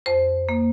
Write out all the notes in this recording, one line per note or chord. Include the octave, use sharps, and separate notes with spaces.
F2 C5
A#3